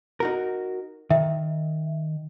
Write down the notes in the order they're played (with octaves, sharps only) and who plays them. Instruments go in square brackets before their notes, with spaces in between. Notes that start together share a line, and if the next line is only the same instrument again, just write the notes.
[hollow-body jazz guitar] D#4 F#4 A#4
[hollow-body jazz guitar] D#3 [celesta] E5